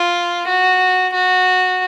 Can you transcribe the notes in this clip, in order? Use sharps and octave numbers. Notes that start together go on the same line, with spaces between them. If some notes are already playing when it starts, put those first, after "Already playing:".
Already playing: F4
F#4
F#4